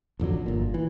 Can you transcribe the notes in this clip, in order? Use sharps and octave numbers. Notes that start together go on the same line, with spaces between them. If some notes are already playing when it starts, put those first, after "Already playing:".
A1 F2 D3 F#3
G1 A#2
E3